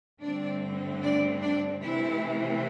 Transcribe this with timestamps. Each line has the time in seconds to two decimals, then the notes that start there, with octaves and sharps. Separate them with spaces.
0.21 G2 D3 A3 C4 D4 D5
1.01 D4 D5
1.41 D4 D5
1.81 C3 E3 A3 C4 E4